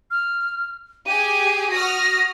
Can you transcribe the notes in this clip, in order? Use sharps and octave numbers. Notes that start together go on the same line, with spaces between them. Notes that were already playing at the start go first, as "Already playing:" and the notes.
F6
G4 G#4 G#5 D#7
F#4 D#6 F6 A#6